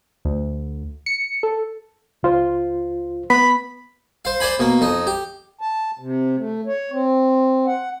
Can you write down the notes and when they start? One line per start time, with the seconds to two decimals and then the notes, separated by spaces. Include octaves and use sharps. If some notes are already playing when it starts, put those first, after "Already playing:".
0.25 D2
1.06 C#7
1.43 A4
2.23 C#2 F4 C5
3.30 B3 B5
4.25 C5 F5
4.40 C5 D5 G#5 B5
4.59 B2 A#3
4.81 F2 D#4
5.07 G4
5.61 A5
5.99 C3
6.36 A3
6.66 C#5
6.92 C4
7.66 F#5